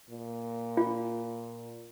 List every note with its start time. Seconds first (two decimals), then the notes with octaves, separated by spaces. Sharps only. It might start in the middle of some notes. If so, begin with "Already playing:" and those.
0.10 A#2
0.77 F4